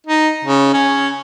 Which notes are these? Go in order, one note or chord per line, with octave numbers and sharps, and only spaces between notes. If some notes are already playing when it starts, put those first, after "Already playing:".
D#4
C#3
C#4